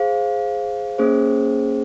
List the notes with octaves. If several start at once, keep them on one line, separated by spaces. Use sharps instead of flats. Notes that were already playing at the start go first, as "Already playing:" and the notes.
Already playing: G#4 C5 F5
A#3 C#4 G#4 C5